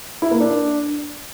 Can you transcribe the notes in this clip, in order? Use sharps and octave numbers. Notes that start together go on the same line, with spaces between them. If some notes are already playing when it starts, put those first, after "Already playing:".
E4
A#3
D4